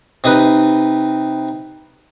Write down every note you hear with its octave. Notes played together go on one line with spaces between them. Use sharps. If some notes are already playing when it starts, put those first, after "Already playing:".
C3 D#4 B4